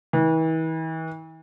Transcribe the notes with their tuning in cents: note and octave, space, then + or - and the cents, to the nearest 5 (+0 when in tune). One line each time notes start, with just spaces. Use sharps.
E3 -40